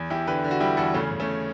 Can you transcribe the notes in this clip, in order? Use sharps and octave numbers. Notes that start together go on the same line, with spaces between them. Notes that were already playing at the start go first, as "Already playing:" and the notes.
Already playing: E2
E2 E4 G4
D3 G4 B4
D3
F#4
G3 E4 G4
E2 F#4 A4
C#3 A3 C#4
C#3
A3 C#4